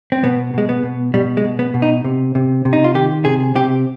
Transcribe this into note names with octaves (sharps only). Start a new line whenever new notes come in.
C4
B2 B3
B2 G#3
B3
B2
B2 G3
G#3
B2
B3
B2
D#4
C3
C3
C3
D#4
F4
D#3 G4
C3 G#4
C3 G4